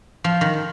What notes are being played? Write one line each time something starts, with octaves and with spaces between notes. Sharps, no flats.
F3
D#3